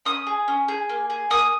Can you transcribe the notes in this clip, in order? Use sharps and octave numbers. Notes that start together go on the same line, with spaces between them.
C#4 D#6
G#4
C#4
G#4
A#3
G#4
A#3 D#6